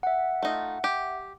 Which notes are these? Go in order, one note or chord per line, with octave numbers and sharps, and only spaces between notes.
E5 F#5
A3 D#4 F4
G4